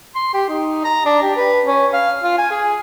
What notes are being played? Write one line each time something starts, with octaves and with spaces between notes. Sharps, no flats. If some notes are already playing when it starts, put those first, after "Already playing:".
C6
G4
D#4
A#5
D4
G4
B4
C#4
F5
F4
G#5
G#4